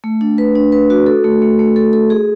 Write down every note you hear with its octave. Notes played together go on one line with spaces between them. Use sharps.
A3
D4
B4
D4
B4
F#4
A4
A3
A3
A3
A4
A4
G#4